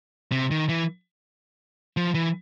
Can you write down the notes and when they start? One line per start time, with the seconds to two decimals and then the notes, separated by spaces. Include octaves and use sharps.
0.32 C3
0.51 D#3
0.69 E3
1.97 F3
2.15 E3